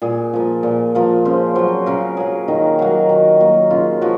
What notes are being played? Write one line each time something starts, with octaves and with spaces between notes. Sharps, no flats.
A#2 G#4
F3 A#3
A#2
F3 A#3
C#3 C5
F#3 A#3 C5
C#3 A#4
F#3 A#3 G#4
D#3 D#4
F#3 A#3
D#3
F#3 A#3
C#3 F4
F3 F#4